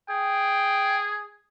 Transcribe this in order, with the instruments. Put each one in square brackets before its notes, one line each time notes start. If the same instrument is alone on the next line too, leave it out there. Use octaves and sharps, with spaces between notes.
[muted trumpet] G#4 [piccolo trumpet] G5